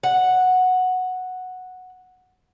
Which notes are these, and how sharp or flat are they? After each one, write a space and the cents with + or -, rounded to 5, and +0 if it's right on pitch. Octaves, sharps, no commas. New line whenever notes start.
F#5 -5